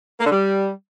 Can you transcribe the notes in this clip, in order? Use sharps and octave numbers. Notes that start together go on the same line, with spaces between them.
A#3
D3
G3